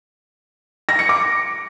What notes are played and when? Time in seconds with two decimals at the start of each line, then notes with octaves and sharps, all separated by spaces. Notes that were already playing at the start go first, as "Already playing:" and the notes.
0.89 A#6
0.99 C#7
1.09 D6